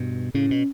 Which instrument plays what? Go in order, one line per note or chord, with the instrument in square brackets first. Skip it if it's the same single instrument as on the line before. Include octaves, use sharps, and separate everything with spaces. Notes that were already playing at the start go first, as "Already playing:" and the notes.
Already playing: [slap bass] G2 B2
[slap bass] A2 C#3 [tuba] C#4
[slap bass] B2